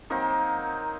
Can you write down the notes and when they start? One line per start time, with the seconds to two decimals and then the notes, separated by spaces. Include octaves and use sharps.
0.10 F#3 A#3 C4 D#4